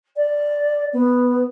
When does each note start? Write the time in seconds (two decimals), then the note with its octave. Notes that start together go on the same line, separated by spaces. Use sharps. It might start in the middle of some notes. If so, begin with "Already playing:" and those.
0.16 D5
0.93 B3